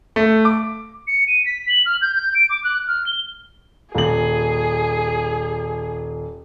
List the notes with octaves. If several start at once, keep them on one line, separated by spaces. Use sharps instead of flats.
A3
D6
C#7
D#7
B6
F#7
F6
G6
G6
D7
D6
F#6
F6
G7
D#1 G#4 F#7